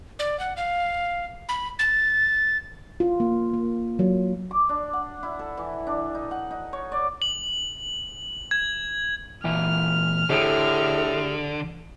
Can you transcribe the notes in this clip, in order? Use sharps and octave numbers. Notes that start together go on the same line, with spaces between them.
D5
F#5
F5
B5
A6
F4
A#3
A#3
F#3
D6
D4
F#5
E4
A4
E3
D4
D#4
F#5
D#4
C#5
D5
F#7
G#6
A#2 E3 E5 F6
A2 D3 G4 G#4